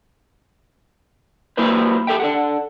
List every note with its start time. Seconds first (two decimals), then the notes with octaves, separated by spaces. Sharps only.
1.57 F#3 A#3 E4 B4 C5
2.07 G4 A4 E5 G5
2.20 D4 A4 F#5